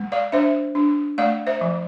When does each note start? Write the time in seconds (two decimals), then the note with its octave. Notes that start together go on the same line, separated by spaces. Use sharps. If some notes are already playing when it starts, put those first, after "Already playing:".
Already playing: G#3
0.12 D5 F5
0.32 D4 C5 E5
0.75 D4
1.18 A3 D5 F5
1.47 C5 E5
1.61 F3